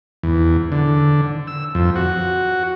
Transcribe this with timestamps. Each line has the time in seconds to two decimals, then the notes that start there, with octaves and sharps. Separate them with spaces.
0.23 E2
0.72 D3
1.47 E6
1.75 F2
1.96 F#4